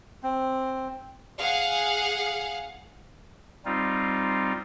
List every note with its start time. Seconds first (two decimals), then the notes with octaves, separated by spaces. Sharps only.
0.23 C4
1.38 G#4 F5 F#5
3.65 G3 C4 D#4 F4